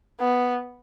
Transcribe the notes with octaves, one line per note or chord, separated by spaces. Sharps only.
B3